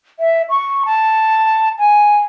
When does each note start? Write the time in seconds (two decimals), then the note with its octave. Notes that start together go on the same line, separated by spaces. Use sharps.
0.20 E5
0.50 C#6
0.86 A5
1.79 G#5